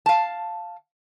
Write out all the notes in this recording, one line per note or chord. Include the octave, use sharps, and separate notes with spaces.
F5 A5